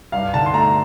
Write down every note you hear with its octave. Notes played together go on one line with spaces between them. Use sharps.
G2 F5
D3 A5
C6
A3 A#5